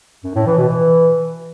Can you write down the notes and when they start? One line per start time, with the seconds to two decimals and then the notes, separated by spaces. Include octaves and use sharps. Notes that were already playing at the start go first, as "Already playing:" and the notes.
0.24 F#2
0.35 A2
0.46 E3
0.57 B2
0.69 E3